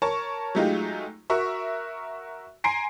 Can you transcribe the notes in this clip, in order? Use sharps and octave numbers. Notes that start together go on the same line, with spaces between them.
A#4 C#5 A5 C#6
F#3 G#3 A3 D#4 F4 G4
F#4 A#4 E5 C#6
G#5 A#5 C6 C7 D7